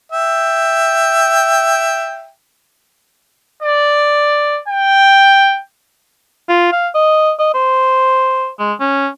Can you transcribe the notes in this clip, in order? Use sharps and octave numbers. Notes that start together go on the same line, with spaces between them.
E5 G5
D5
G5
F4
F5
D#5
D#5
C5
G#3
C#4